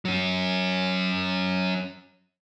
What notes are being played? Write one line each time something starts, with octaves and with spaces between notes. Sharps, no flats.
F#3 C#4